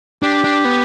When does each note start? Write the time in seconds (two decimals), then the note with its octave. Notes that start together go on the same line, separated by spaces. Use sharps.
0.23 D4 G4
0.44 D4
0.65 B3